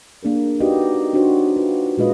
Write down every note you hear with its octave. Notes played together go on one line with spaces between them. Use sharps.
A#3 D4 G#4 A#4
D#4 F#4 G4 B4 D5 D#5
D4 D#4 F#4 C5 C#5
F4 B4
A#2 G#3 F4 F#4 B4 D#5